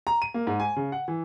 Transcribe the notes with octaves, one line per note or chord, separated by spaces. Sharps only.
A#5
D#7
A#3
G#2
G#5
C#3
F#5
E3